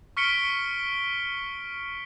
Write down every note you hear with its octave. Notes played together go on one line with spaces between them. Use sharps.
C#6 F6 B6 C#7 D7 G7